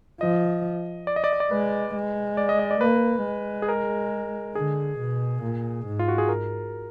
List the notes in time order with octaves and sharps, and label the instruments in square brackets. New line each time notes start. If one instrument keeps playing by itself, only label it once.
[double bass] F3 [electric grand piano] D#5
[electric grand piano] D5
D#5
D5
D#5
D5
[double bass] G#3 [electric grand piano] B4
[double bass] G#3
[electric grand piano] D5
D#5
D#5
D5
[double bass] A#3 [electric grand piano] B4
[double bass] G#3
[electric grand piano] G#4
A#4
[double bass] D3 [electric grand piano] G#4
[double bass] B2
A#2
G#2
[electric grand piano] F4
F#4
G#4
A#4